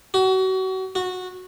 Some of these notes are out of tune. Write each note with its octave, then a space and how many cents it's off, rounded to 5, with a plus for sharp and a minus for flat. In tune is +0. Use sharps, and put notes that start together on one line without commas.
F#4 +30
F#4 -15